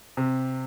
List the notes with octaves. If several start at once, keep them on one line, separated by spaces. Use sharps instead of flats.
C3